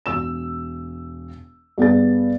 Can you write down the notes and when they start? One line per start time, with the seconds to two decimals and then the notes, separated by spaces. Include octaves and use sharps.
0.06 E1 E6 E7
1.78 G2 B3 G#4 A6